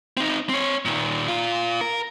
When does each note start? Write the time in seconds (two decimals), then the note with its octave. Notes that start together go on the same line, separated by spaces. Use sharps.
0.17 C4 D#4
0.49 C4 C#5
0.85 A#2 D#3
1.28 A#2 F4
1.81 A#4